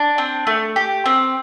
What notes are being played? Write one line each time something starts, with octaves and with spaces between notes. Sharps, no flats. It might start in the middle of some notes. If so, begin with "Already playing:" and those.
Already playing: D4
C4
A3
G4
C4